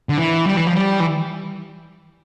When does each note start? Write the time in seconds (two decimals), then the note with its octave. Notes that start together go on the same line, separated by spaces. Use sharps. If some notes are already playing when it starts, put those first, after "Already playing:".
0.09 D3
0.18 E3
0.47 G3
0.57 E3
0.67 F3
0.76 G3
1.00 E3